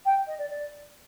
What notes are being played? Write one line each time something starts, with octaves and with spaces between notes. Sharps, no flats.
G5
D#5
D5
D5